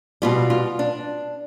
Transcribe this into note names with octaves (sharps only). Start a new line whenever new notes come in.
B2 G3 F4
F4
D4